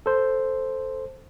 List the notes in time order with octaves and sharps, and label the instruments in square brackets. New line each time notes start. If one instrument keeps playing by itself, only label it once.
[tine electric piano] A4 C5